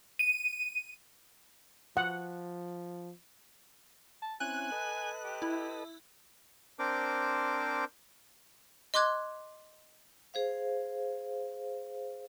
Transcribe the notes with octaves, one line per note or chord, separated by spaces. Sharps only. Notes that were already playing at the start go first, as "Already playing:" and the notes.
D#7
F3 F#5
A5
C4 C#4 E4 G#5 F#6
A4 B4 D#5
G4
E4
C4 D4 A#4 C5 D6
D#5 C6 D6 F#6 G#6
G#4 C5 F5